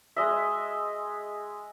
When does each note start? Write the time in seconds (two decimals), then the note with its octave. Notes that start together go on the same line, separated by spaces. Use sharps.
0.16 G#3 D#5 E5